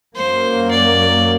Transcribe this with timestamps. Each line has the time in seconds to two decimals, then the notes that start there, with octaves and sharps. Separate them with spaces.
0.15 F#2 F#3 A#3 C5
0.71 D5